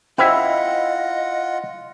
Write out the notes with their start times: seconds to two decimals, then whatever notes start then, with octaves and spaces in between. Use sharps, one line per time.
0.18 C#4 E4 F4 C5 D#5 E5 F#5 G5